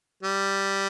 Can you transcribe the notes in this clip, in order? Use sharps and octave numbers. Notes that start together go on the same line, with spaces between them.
G3